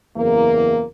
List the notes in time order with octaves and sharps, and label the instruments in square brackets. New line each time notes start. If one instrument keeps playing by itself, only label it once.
[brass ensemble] F#1 E2 A#3